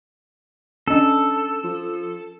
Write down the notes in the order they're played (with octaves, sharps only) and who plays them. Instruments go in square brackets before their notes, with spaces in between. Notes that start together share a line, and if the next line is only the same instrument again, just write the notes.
[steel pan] C#4 D4 D#5 [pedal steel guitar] A4
[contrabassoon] F3